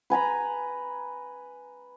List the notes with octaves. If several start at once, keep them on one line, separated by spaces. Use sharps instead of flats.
B4 G#5 A#5 B5